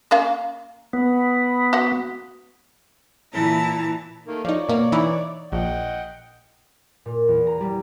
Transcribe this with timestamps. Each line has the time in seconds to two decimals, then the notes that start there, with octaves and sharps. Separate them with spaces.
0.11 A#3 C#4 F5
0.93 B3
1.73 F#4 F#5
3.32 A#2 E3 E4 A5 A#5
4.26 D#3 A3 A#3
4.45 F3 D#4 C#5 D5
4.69 B2 A#3
4.92 E3 D#4 E4
5.52 A#1 D#5 F#5 G5
7.06 A#2
7.28 E2
7.47 A#5
7.60 G3